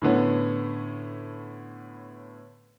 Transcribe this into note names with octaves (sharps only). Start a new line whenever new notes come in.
A2 D3 B3 C#4